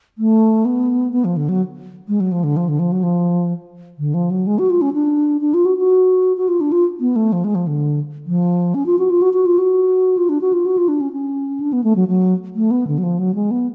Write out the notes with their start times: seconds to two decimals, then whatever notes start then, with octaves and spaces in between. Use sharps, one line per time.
0.18 A3
0.65 B3
1.13 B3
1.24 F3
1.37 D3
1.49 F#3
2.08 G#3
2.20 F#3
2.32 F3
2.43 D3
2.57 F3
2.68 D3
2.79 F3
2.92 F#3
3.03 F3
3.99 D3
4.14 F3
4.30 F#3
4.47 G#3
4.59 F#4
4.70 F4
4.81 C#4
4.93 D4
5.41 D4
5.54 F4
5.65 F#4
5.77 F#4
6.37 F#4
6.48 F4
6.61 D4
6.72 F4
7.00 B3
7.16 A3
7.32 F3
7.44 G#3
7.55 F3
7.67 D3
8.27 F3
8.74 C#4
8.86 F4
8.99 F#4
9.10 F4
9.22 F#4
9.33 F#4
9.46 F4
9.58 F#4
10.17 F4
10.29 D4
10.41 F#4
10.53 F4
10.66 F#4
10.77 F4
10.88 D4
11.01 C#4
11.12 C#4
11.60 D4
11.73 B3
11.84 A3
11.96 F#3
12.08 F#3
12.55 A3
12.71 B3
12.87 D3
12.98 F#3
13.03 F3
13.18 F#3
13.35 G#3
13.51 B3